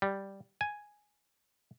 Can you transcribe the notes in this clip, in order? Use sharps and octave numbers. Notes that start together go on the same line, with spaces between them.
G3
G#5